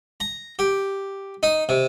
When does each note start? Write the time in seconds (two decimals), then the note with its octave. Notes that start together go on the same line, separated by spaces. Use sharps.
0.20 A#5
0.59 G4
1.43 D#4
1.69 C3